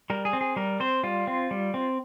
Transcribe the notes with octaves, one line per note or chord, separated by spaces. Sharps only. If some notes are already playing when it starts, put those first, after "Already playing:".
G3 A#4
G#4
C4
G#4
G3 A#4
C4 C5
G3 F4
C4
G3
C4